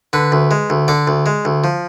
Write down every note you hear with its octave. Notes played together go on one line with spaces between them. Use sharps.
D3 B4
D2
G#3
D2
D3 D5
D2
G#3
D2
F3